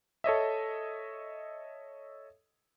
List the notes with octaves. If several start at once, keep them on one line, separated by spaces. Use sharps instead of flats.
A4 C#5 D#5 E5